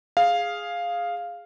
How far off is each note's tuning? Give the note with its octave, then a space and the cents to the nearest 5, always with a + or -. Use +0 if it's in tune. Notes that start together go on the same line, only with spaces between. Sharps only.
G#4 +0 F5 +0